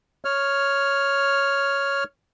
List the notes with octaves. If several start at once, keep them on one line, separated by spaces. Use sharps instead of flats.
C#5 F6